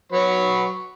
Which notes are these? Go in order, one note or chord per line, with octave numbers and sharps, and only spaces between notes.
F#3 B4 C#5